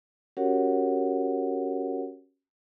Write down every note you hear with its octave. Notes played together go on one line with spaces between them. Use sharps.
C#4 F#4 G4 A#4 C#5 F#5